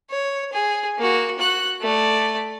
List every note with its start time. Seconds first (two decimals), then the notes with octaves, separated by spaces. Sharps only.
0.10 C#5
0.53 G#4
0.98 A#3 F#4
1.39 F#4 F#6
1.81 A3 D5